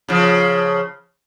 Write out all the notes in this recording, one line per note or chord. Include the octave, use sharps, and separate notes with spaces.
C#3 F3